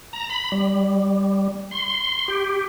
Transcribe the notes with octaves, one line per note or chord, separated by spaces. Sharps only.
A#5
B5
G3
C6
G4